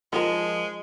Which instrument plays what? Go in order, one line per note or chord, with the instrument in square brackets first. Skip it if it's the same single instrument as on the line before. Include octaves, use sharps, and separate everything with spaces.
[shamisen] D#3 A#4 [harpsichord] F3 [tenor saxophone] G#3